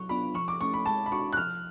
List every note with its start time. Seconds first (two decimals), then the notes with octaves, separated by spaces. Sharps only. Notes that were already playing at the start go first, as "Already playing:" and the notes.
Already playing: F#3 C#6
0.09 B3 D4 F4 B5
0.34 F3 C#6
0.48 D6
0.61 A3 C#4 C#6
0.74 B5
0.86 G#3 A5
1.06 B5
1.12 D4 F#4 C#6
1.33 F#6
1.37 F3 F6